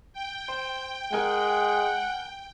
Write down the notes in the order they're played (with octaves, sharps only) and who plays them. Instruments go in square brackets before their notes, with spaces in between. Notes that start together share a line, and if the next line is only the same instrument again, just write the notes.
[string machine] G5
[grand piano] C5
[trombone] G#3 [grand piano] A#4 G#5 [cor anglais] F#5